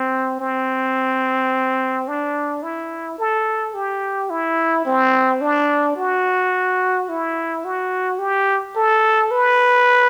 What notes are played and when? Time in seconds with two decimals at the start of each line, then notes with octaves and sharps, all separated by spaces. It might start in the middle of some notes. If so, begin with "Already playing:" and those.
Already playing: C4
0.40 C4
2.08 D4
2.63 E4
3.19 A4
3.74 G4
4.30 E4
4.86 C4
5.41 D4
5.96 F#4
7.09 E4
7.65 F#4
8.19 G4
8.76 A4
9.31 B4